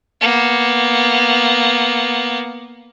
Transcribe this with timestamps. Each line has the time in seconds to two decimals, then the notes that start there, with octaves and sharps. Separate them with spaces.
0.21 A#3 B3